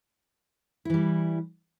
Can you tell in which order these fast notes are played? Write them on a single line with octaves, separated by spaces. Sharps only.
E4 E3 G3